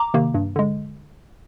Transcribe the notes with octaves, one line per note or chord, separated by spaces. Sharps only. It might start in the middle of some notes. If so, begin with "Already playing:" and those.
Already playing: A#5 D6
C3 D#3 A#3
G2
D3 G#3